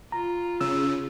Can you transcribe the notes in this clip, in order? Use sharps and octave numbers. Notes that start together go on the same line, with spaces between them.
F4 A#5
C#3 E6